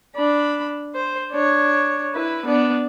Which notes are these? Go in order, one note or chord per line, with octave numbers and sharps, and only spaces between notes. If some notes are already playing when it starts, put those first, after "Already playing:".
D4 B5
C5
D4 C#5
E4 B4
B3 D4